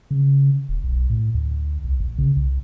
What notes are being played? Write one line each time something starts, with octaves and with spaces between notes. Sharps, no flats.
C#3
D1
B1
A2
D2
C2
A#1
C#3
C2